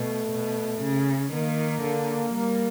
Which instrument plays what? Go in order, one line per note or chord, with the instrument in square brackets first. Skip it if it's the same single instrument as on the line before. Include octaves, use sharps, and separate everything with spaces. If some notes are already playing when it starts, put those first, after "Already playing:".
Already playing: [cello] B2 [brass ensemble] A3
[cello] B2
C#3
[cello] D#3 [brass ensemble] A#3
[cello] D3
G3